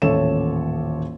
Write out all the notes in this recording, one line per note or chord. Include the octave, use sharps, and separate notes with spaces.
D#1 A1 A4 C#5 E7